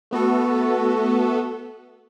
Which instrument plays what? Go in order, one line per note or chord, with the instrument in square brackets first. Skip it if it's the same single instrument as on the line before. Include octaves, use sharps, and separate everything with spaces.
[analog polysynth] A3 B3 F#4 A4